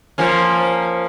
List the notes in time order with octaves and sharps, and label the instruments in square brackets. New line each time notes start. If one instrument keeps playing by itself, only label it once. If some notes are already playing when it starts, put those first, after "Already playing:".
[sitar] F3 A#3 C#4